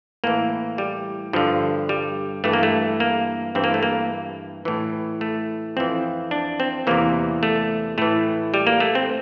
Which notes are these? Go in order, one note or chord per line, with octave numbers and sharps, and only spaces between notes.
A2 E3 A#3
G3
G2 D3 F3
G3
G2 E3 A3
A#3
A3
A#3
G2 E3 C4
A#3
A3
A#3
A2 E3
A3
F2 E3 C4
D4
C4
E2 C3 E3 A#3
A3
A2 E3 A3
G3
A#3
A3
C4